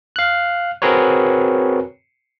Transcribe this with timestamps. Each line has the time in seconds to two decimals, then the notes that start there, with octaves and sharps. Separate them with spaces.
0.16 F5 F#6
0.82 C4 F#4 G#4 A#4 B4 C#5